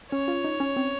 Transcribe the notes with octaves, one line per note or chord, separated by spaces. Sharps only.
C#4 C#5
F4
D#4
C#4
C4